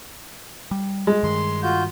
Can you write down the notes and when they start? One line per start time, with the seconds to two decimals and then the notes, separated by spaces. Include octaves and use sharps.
0.71 G3
1.07 G#3
1.23 G2 D#3 C6
1.63 F4 F#4 G6